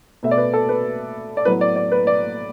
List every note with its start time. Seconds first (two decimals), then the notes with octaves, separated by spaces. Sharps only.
0.23 B2 A3 E5
0.31 D5
0.38 B4
0.53 A4
0.69 B4
1.37 D5
1.45 A2 F#3 B3 B4
1.61 D5
1.76 D5
1.92 B4
2.07 D5